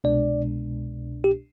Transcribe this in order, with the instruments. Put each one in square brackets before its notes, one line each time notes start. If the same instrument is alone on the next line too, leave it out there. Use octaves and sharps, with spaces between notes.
[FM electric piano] C2 B2 G#3 D4 [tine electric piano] D5
[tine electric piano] G4